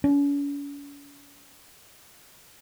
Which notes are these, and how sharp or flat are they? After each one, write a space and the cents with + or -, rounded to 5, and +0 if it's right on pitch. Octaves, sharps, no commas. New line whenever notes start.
C#4 +45